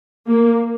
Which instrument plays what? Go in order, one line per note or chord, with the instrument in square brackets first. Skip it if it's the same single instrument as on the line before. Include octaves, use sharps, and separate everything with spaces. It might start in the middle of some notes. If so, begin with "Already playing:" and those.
[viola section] A#3